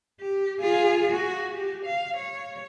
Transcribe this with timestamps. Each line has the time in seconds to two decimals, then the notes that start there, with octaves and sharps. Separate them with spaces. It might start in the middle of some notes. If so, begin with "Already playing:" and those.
0.20 G4
0.61 F4 G#4
1.11 F#4
1.55 G4
1.85 F5
2.17 C#5